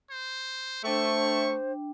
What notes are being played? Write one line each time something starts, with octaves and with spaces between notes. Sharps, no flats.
C5
A3 D4 C5 G5 C#6